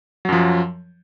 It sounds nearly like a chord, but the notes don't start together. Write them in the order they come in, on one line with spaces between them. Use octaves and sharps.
F#3 F#2 F3